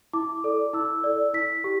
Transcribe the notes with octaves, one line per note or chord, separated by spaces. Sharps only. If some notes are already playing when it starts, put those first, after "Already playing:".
E4 D6
A4 D5
E4 E6
A4 D5
E4 B6
G4